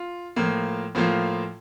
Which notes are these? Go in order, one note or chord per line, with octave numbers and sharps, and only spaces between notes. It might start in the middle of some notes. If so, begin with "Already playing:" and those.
Already playing: F4
A2 F3 A#3 F4
A2 F3 A#3 F4